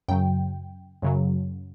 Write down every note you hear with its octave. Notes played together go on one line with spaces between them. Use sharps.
F#2 C#3 F#3 G5
F#2 C#3 F#3